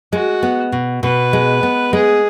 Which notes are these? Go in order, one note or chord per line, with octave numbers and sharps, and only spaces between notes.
G#3 F#4
B3
B2
B2 B4
G#3
B3
G#3 G#4